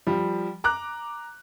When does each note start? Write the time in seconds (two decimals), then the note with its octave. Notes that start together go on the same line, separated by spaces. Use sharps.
0.07 F3 G3
0.64 A#5 D6 F#6